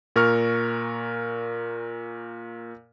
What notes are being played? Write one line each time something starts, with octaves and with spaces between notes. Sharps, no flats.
A#2 A#4 C#6 F6